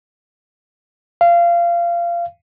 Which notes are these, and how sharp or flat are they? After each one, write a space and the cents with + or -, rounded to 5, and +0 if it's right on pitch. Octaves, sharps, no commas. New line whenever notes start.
F5 -20